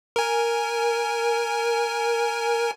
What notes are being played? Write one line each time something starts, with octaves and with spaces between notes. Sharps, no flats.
A#4 G#5